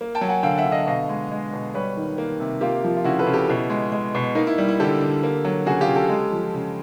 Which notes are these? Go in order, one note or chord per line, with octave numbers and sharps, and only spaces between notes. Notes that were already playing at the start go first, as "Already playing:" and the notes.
A#3
G5 A5
F#3
F#5 G#5
D3 F5 G5
E5 F#5
D3
D#5 F5
B2 D#5 F5
G#3
G#3
B2
G3 B4 C#5
D#3
A#3
C3
A#3 F4 G4
F3
F4
C#3 E4 F#4
A4 B4
C#3
G4 A4
B2 E4
G#3
G#3
B2
A#3 D#4
E4
G3
E4
D3 G4 A4
D3
A#3
F#3
C#3 F#4 G#4
F4 G4
C#3
G4 A4
G#3
F3
C#3